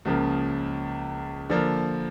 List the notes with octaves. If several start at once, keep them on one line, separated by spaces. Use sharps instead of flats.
C#2 C#3 F3 A#3
D3 F3 A#3